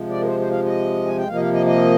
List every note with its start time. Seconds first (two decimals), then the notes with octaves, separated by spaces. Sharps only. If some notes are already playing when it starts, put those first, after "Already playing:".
Already playing: C3 F3 G#3
0.09 D5
0.21 A#4
0.27 C5
0.40 C5
0.51 F5
0.65 D#5
1.06 G#5
1.17 G5
1.28 C3 F3 A#3 F5
1.35 D#5
1.41 F5
1.53 D#5
1.66 D#5